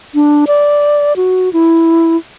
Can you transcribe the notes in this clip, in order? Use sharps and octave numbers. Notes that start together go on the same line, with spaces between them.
D4
D5
F#4
E4